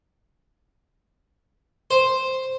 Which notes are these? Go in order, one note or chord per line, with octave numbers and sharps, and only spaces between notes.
C5